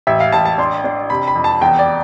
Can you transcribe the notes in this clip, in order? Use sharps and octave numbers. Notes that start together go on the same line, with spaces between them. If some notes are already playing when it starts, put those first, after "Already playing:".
A1 E5
F5
A1 A5
A5
D4 C6
D4
C3 B5
B5
F2
A5
E2 G5
D5